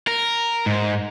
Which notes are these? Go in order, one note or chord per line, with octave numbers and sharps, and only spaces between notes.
A#4
G#2